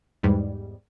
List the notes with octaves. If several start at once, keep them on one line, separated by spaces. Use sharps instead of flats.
E2 G#2 G3